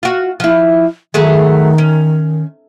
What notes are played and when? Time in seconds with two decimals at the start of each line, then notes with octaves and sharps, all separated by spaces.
0.03 F4 F#4
0.40 F3 E4
1.14 D#3 F#3 A3 G#4
1.78 C#4